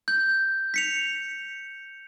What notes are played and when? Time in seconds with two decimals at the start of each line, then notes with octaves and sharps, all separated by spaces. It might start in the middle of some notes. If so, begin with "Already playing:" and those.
0.08 G6
0.74 B6 C#7 F7